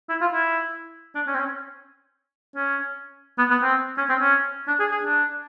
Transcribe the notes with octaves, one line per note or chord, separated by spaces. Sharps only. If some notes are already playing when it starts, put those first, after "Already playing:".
E4
F4
E4
D4
C#4
C4
C#4
C#4
B3
B3
C4
C#4
C4
C#4
D4
G#4
G#4
D4